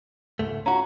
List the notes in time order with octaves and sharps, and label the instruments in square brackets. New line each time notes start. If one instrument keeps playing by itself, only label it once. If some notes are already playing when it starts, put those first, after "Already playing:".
[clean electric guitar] C#2 G#2 A3
[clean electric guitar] C#4 F#4 [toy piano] F4 F#5 A#5